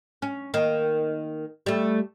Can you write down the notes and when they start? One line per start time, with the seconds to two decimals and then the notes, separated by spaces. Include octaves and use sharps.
0.22 C#4
0.54 D#3 A#3
1.66 G3 A3